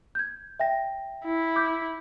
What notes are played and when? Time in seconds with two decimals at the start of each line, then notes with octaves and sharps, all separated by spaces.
0.15 G6 G#6
0.60 E5 G5 A#6
1.25 E4
1.56 D6 G6